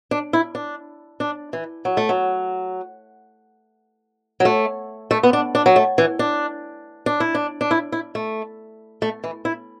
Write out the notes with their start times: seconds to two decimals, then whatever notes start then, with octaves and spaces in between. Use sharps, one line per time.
0.11 D4
0.33 E4
0.55 D4
1.20 D4
1.53 E3
1.85 F#3
1.97 A3
2.09 F#3
4.40 F#3
4.45 A3
5.11 A3
5.23 B3
5.33 D4
5.55 D4
5.66 F#3
5.76 A3
5.98 E3
6.19 D4
7.06 D4
7.20 E4
7.35 D4
7.61 D4
7.71 E4
7.92 E4
8.15 A3
9.02 A3
9.24 E3
9.45 E4